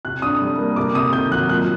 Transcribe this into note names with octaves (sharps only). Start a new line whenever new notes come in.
C3 F#6
D4 D#6
G3
A#3
C3 D6
C3 D#6
D#3 G6
F#3 F#6
A#2 F#6